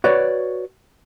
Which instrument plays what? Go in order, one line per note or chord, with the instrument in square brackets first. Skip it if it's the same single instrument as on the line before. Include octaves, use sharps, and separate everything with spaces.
[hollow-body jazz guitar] F#4 B4 C#5 D5